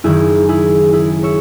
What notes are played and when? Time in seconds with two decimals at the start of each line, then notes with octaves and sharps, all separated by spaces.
0.04 F#1 F#2 D#3 E4 G#4
0.49 E4 G#4
0.93 E4 G#4
1.23 C#5 E5